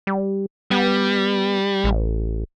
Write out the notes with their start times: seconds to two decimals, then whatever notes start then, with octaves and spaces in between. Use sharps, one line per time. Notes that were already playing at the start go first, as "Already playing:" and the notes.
0.07 G3
0.71 G3 B3
1.84 A1